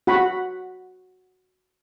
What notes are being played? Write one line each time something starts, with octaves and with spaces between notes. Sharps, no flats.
F#4 F#5 B5